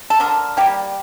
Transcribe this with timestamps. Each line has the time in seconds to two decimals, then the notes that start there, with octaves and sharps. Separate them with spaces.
0.10 A4
0.20 D3 A#4
0.57 G3 A#3 G4